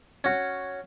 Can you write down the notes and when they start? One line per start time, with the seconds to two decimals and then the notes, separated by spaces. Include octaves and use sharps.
0.24 C#4 F#4